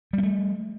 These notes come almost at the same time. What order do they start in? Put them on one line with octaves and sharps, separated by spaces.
G3 B3 A3